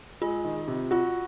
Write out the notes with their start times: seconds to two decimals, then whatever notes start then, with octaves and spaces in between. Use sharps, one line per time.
0.21 G#3 F4
0.44 D#3
0.68 C3
0.91 F4 F#4